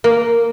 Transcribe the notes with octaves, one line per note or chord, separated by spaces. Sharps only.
A#3